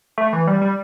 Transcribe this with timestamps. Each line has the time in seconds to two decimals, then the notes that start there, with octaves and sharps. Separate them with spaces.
0.18 A3
0.33 E3
0.47 G3
0.61 G3